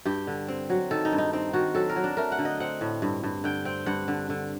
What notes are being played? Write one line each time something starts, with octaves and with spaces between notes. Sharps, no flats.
G2 G4
D3
C4
F#3
D#3 A4
D#4
G2
D#4
C4 D#4
D#3 F#4
F#3 A4
A#4
F#3
D4
A3 A#4
F#5
D3
D#5
C4 F#5
A2
G2
G2
D3 G5
C4 G5
G2 F#5
D3
D3